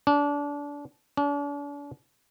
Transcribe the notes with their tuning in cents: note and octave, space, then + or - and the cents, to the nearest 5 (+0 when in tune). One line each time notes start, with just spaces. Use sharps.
D4 -25
D4 -40